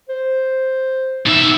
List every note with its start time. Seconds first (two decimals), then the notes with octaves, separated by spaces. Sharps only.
0.09 C5
1.26 B2 D#4 E5